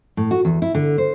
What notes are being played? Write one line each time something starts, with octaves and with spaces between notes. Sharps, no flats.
A2
F#4
E2
E4
D3
C5